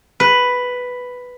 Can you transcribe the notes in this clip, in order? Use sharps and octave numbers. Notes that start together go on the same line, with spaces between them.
B4